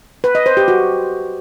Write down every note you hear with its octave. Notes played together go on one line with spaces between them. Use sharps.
B4
D#5
C5
G4
F#4